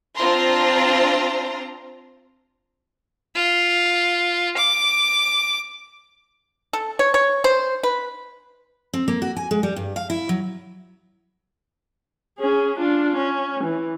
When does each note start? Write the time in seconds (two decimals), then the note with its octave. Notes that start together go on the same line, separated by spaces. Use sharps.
0.18 C4 D4 F4 C5 A#5 C6
3.36 F4
4.57 D6
6.73 A4
6.99 C#5
7.14 C#5
7.44 C5
7.83 B4
8.93 C4
9.08 A#3
9.22 F#4
9.36 G#5
9.51 G#3
9.63 G3
9.76 G2
9.96 F5
10.10 E4
10.29 F#3
12.39 C#4 G#4
12.79 D4 F4
13.16 C#4
13.64 E3